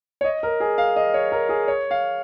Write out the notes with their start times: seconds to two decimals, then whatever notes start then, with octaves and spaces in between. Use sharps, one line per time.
0.21 C#5
0.24 D#5
0.43 A#4
0.60 G#4
0.78 F5
0.96 D#5
1.14 C#5
1.32 A#4
1.49 G#4
1.68 C#5
1.91 F5